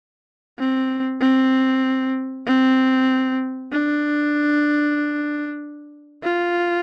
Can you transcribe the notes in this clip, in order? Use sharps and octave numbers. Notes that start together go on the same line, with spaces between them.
C4
C4
C4
D4
F4